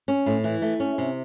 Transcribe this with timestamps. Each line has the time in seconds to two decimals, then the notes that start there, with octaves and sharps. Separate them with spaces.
0.08 C#4
0.26 A2
0.44 E3
0.62 A3
0.80 C#4
0.98 C3